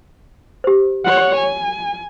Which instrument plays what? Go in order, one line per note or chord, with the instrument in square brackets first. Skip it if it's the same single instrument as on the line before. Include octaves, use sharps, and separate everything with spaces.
[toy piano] G4 C5
[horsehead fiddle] C#5 F#5
G#5